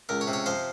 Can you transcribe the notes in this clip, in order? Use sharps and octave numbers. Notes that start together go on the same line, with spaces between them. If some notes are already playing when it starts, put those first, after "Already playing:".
C#2 A#4
C#5
C3
C#5
F3 C5